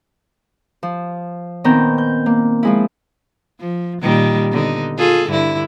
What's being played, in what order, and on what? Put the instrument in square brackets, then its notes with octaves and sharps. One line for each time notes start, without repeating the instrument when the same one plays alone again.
[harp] F3
A#2 D#3 B3 C4 A#5 G6
G6
A#3
F3 G#3 E4
[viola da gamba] F3
A#2 D#3 G3
D3 B3 D#4
F4 G#4 A4
G2 D3 E4